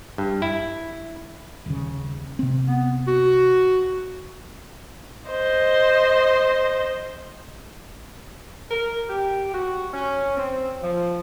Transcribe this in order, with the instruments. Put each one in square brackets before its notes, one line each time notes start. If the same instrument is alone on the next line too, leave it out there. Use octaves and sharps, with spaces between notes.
[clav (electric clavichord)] G2
E4
[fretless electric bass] D#1 C#3
C3 C4
[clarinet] B3
F#4
[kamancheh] C5 D#5
[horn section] A#4
G4
F#4
C#4
C4
F3